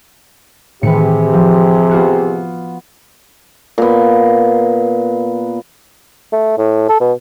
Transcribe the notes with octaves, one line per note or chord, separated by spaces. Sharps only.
A2 C3 D#3 E3 G4 G#4 B4 C#7
F3
B3 F4 F#4
A#2 B3
A3
A2
A4
B2